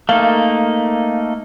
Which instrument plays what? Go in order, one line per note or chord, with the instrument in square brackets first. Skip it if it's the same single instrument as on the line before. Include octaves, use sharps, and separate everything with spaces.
[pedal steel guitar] A3 A#3 D#4 [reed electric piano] F5